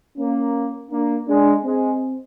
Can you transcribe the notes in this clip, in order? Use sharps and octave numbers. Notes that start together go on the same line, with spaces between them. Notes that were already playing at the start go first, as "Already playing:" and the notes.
A#3 C#4
A#3 D4
G#3 D4
G#3 C4